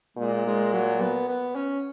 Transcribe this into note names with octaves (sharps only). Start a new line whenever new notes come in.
A#2 G#3
G#3
F#3
B3
B3
C#4